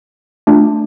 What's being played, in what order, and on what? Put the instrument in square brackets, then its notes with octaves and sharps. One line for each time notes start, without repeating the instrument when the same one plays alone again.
[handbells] A3 D4 F4